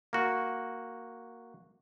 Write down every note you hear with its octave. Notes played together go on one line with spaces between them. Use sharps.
A#3 F#4